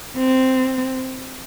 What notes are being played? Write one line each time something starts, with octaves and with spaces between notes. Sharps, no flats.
C4